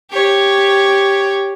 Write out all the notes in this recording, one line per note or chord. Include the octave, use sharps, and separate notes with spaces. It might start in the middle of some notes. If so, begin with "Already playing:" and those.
G4 C#5